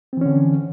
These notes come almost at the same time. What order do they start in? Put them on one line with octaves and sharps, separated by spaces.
C4 E3 C#4 D3